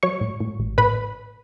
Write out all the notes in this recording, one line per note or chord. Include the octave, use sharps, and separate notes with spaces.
F#3 C#5 C#6
A2
A2
A1
A2 B4 B5